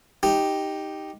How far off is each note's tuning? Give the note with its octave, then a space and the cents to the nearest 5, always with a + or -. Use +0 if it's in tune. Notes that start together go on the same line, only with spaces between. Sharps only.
D#4 +0 G4 +0